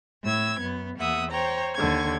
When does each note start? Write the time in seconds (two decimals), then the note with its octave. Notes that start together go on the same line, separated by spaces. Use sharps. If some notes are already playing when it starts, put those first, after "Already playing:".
0.23 A2 E6 G#6
0.60 F#2 B3
0.98 E2 A#3 E5 F#5 D#6
1.31 C5 C#5 G5 A#5
1.74 D#2 D3 C#6 G#6